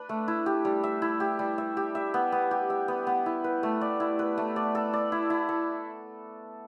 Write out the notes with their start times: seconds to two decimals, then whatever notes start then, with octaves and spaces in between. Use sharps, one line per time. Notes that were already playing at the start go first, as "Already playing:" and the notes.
Already playing: D4 B4
0.09 A3
0.28 E4
0.46 G4
0.65 G3
0.83 E5
1.02 E4
1.20 G4
1.39 G3
1.58 E5
1.77 G4
1.95 E5
2.14 B3
2.32 B3
2.51 G4
2.70 E5
2.88 B3
3.07 B3
3.26 E4
3.44 B4
3.63 A3
3.81 D5
4.00 E4
4.19 B4
4.38 A3
4.56 D5
4.75 A4
4.93 D5
5.12 E4
5.30 E4
5.49 A4